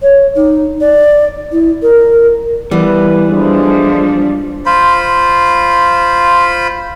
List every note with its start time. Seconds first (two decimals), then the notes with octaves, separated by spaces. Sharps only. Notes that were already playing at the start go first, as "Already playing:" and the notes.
0.02 C#5
0.35 D#4
0.80 D5
1.51 E4
1.82 A#4
2.71 E3 G3 B3 B4
3.30 F3 G#3 A3 D4 C5
4.66 F4 C5 B5